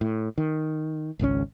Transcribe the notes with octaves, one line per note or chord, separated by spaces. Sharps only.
A2
D#3
G#1 C#2 C3 C#4